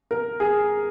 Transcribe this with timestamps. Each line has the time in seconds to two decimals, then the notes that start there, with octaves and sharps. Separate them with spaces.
0.11 A#4
0.40 G#4